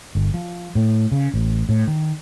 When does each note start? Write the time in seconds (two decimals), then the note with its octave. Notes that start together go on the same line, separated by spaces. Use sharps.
0.15 G1
0.34 F3
0.75 A2
1.12 C#3
1.34 A1
1.69 A2
1.87 D#3